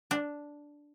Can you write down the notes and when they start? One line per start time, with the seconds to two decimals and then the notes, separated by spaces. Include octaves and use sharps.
0.11 D4